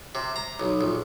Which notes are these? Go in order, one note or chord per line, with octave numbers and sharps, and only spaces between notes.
C3
A#5
B1
A#1